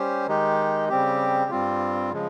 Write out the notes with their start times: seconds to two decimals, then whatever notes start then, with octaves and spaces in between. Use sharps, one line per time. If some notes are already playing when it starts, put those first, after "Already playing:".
Already playing: G3 C#4 G4 C5
0.27 D#3 G#3 D#4 G4
0.89 C#3 G3 C4 G4
1.51 G2 G3 C4 F4
2.12 C#3 F3 G#3